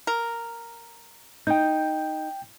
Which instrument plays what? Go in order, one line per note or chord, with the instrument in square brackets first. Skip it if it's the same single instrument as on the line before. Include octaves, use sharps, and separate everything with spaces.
[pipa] A#4
[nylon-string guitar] D#4 [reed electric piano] G5 G6